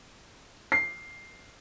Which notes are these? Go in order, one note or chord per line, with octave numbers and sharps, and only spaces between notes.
C7